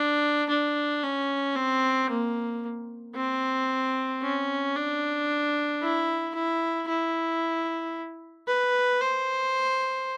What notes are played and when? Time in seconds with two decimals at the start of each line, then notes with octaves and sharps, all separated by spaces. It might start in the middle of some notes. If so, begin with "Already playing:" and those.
Already playing: D4
0.49 D4
1.04 C#4
1.56 C4
2.10 A#3
3.16 C4
4.22 C#4
4.76 D4
5.82 E4
6.34 E4
6.88 E4
8.48 B4
9.01 C5